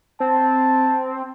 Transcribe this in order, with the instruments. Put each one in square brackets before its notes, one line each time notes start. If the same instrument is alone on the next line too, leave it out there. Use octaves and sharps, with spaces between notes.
[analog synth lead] C4 [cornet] A5